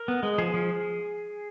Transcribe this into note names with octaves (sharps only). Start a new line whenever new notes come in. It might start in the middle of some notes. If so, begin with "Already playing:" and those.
Already playing: A#4
B3
G#3
F3 G#4
F3